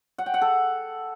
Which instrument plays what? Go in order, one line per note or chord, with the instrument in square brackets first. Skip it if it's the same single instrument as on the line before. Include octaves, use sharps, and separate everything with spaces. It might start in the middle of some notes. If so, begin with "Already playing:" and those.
[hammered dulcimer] F#5
G5
F#5
A4